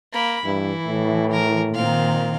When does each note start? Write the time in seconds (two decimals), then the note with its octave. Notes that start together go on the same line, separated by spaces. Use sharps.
0.12 A#3 B5
0.45 G2 E3 E4
0.87 A2
1.31 A#4
1.74 A#2 D#3 C4 F5